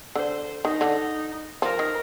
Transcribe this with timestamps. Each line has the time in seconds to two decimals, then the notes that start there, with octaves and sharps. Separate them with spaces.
0.15 D3 C5
0.64 D#3 D#4
0.81 D3
1.62 F3 A#4
1.79 D#3